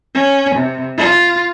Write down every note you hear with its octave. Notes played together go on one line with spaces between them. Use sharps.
C#4
C3
F4